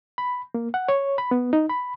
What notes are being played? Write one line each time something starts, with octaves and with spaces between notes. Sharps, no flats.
B5
A#3
F#5
C#5
B5
B3
D#4
B5